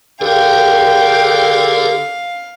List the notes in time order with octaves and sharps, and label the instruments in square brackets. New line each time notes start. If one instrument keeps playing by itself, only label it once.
[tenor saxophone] D3 [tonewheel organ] G4 G#4 A#4 [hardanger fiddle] F5 [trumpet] G5